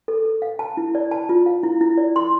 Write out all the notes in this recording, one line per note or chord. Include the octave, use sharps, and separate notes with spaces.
A4
A4
F5
A5
E4
D5
A5
F4
F5
E4
E4
D5
C6